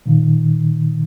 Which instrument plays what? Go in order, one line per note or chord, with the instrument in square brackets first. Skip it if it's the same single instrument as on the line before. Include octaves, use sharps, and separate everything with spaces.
[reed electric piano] A#2 D#3